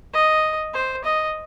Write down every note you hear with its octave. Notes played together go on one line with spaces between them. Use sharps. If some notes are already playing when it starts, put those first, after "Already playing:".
D#5
C5
D#5